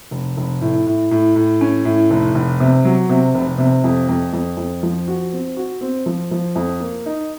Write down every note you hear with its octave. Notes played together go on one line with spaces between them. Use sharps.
F1
F1
A2
A2
A2
A2
C#4
A2
F1
F1
C3
F#3
C3
F1
C3
F2
F2
F2
F2
F3
F#4
C4
F#4
C4
F3
F3
F2
A#3
D#4